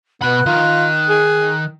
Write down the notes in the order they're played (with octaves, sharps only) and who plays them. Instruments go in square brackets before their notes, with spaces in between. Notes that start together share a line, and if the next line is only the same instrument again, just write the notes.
[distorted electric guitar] B2 B5 [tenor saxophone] B3 [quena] F#6
[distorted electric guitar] D#3 [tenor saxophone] F4
[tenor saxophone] G#4